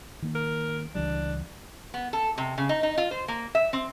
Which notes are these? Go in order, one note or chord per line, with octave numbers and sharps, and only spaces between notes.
D#3 A#3
A#4
C#2 E3 G3 D4
B3
A4
C3
C#3
D#4
D#4
F4
C5
A#3
E5
C4